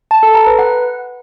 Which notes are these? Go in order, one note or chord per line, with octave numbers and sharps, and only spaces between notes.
A5
A4
A#5
B4
F#5